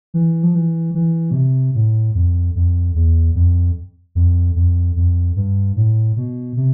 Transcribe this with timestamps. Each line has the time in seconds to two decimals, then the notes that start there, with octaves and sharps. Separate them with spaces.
0.14 E3
0.43 F3
0.55 E3
0.94 E3
1.31 B2
1.34 C3
1.75 A2
2.15 F2
2.56 F2
2.95 E2
3.35 F2
4.15 F2
4.56 F2
4.96 F2
5.36 G2
5.76 A2
6.16 B2
6.57 C3